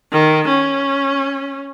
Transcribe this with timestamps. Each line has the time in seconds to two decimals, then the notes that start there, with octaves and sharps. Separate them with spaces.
0.12 D#3
0.49 C#4